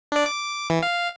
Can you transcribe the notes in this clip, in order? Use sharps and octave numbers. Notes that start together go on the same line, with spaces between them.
D4 D5
D6
E3
F5